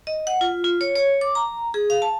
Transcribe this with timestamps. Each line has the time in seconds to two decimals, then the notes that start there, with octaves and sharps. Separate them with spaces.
0.07 D#5
0.27 F#5
0.41 F4
0.64 F4
0.81 C#5
0.96 C#5
1.21 D6
1.35 A#5
1.74 G#4
1.90 F5
2.02 A5